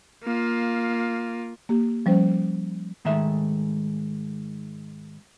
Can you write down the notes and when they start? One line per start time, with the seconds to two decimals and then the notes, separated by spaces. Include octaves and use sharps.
0.24 A#3 F4
1.69 A#3 G4
2.06 F3 G3 C#4 C5
3.05 G#2 D#3 G#3 A3 E5